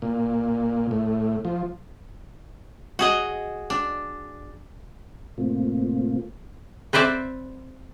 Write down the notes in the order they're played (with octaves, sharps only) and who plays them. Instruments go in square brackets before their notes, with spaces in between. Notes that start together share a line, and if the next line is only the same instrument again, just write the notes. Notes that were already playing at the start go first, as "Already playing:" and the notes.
[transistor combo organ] A#2
A2
F3
[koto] F#4 G#4 D#5
D4
[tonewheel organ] G#2 B2 A3 A#3 C4 F4
[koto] C4 B4 C5 D5 E5